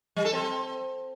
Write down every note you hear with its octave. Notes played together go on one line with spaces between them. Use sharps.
G3
A4
C4